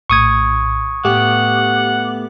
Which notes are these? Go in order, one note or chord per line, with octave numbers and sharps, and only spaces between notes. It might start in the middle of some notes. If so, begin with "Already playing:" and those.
A#1 A2 C#6 D#6 G#6
A2 A3 B3 G4 F#5 D6